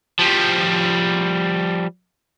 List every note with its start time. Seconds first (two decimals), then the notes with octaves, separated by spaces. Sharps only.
0.19 F3 G3